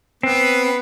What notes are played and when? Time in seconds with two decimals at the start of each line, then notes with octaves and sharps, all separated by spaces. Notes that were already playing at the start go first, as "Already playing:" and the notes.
0.23 B3 C4 B4